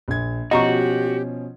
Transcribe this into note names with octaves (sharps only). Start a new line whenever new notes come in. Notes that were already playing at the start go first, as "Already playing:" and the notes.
A#1 G#6
B2 F3 C#4 F#4 G4 D#5 A#5 C#6